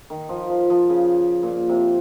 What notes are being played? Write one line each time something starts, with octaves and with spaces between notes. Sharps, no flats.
D#3
F3
F3
F3
C#3
A#2
C3